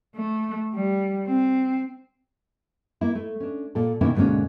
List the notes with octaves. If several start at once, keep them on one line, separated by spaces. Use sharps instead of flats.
A3
G3
C4
A#3 E4
A3
C#4 D4
A#2 A4
B2 D#3 A#3 C#4 E4
D2 G#2 B2 A#3 C#4